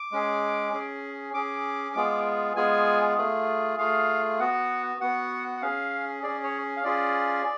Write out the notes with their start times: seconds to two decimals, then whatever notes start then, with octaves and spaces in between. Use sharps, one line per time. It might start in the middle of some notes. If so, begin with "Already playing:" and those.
Already playing: D6
0.12 G#3 C#4 G#4
0.73 C#4 G#4
1.34 C#4 G#4 D6
1.96 G#3 B3 F4 G#4
2.56 G#3 B3 F4 G#4 G#5
3.17 A3 F4 G#4
3.78 A3 F4 G#4 F5
4.40 B3 F#4 F#5
5.01 B3 F#4 F#5
5.57 F#5
5.62 C#4 G#4 F5
6.23 C#4 G#4 D5
6.44 C#5
6.77 F5
6.84 C#4 F4 G#4 D5